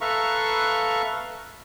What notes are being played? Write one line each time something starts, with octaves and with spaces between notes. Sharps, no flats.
A4 B4 E5 F5 A#5 C#6